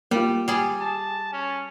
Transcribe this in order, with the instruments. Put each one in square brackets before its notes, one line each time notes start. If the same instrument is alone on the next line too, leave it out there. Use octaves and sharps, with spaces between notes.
[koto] G3 [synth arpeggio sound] A#3 F4
[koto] G3 G#4
[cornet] A5
C#4